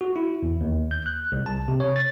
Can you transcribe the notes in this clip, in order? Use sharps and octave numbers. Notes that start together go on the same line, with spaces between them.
F#4
E4
E2
D#2
G6
F#6
C2
A5
C3
C#5
A6